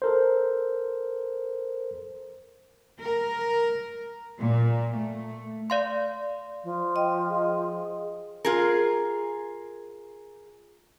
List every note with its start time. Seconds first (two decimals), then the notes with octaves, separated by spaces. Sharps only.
0.02 A4 A#4 C5
3.01 A#4
4.39 A#2
4.97 A3
5.70 D5 F5 C6
6.63 F3
6.96 D#5 G5
7.28 G#4
8.45 F4 G#4 A#4